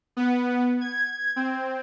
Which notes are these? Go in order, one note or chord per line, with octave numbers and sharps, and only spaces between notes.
B3
G#6
C4